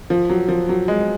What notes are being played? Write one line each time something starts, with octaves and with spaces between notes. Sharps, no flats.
F3
F#3
F3
F#3
G#3